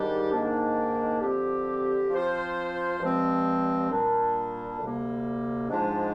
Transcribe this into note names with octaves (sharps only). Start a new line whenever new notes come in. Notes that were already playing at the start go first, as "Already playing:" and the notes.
Already playing: G#2 D#3 G3 D4 G4
G#2 D#3 A#3 D4
D3 F3 C4 G4
F3 C4 F4 C5
G2 F3 G#3 C4
A#2 G3 D4
D2 C3 G3 A#3
G#2 F3 G#3 D4